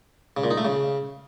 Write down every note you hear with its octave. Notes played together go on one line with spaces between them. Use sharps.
C#3
A#2
D#4
A3
C#3